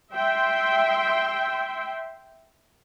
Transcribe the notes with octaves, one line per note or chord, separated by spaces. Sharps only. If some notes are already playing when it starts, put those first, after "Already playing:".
E5 G5 C6